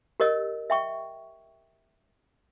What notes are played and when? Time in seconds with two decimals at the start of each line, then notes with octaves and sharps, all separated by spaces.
0.20 G4 A#4 C#5 D#5 E6
0.70 E5 G5 C#6